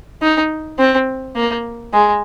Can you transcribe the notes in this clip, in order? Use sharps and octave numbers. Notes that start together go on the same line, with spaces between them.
D#4
C4
A#3
G#3